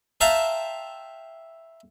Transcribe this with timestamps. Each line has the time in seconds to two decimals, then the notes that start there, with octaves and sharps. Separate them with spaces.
0.21 C5 E5 F5 G5 A5 A#5